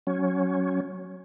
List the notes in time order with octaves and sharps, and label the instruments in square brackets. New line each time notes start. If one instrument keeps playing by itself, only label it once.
[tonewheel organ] F#3 C#4